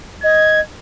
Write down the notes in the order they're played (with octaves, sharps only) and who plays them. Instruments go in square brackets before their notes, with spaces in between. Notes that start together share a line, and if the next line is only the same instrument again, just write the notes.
[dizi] D#5 [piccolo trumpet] G#6